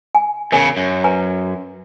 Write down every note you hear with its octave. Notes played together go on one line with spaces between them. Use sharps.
G#5
E2 C#3 A#4 C#5 G#5
F#2
B4 G#5 A#5